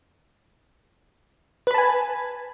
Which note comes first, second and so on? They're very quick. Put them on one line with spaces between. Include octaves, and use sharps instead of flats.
B4 B5 A5 G#5